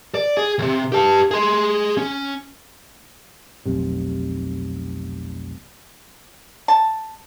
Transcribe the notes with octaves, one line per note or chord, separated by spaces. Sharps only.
D5
G#4
D2 C3
G4 A5
G#4 C6
C#4
F1 B1 C3
A5